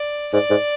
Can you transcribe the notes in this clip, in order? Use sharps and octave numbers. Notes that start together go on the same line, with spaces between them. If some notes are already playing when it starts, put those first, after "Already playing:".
Already playing: D5
G#2 D5
G#2